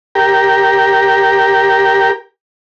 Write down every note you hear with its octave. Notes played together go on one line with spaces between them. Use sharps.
G4 A#4